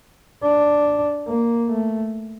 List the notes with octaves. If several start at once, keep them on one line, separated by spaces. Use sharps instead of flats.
D4
A#3
A3